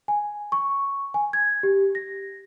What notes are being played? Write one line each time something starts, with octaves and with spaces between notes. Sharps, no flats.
G#5
C#6
G#5
G#6
G4
A#6